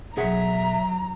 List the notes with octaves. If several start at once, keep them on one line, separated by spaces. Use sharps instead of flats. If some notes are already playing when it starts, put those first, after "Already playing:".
B1 F#3 G#4 E5 F#5 A#5